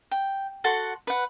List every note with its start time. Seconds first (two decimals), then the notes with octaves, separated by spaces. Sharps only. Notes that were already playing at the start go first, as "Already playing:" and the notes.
0.11 G5
0.64 F#4 A4 F#5 C6
1.07 B4 F#5